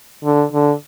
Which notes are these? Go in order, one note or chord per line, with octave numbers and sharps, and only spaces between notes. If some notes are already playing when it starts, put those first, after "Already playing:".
D3
D3